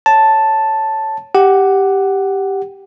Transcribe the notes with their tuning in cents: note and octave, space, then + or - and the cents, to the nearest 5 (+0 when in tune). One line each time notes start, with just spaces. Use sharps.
C#5 +0 A5 +0
G4 +0 F#5 +10